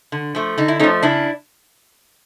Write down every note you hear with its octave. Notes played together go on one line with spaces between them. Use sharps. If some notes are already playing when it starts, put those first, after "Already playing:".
D3
F3 A3
D3 D#4
E4
F3 A3 C#4 D#4
C#3 D4 E4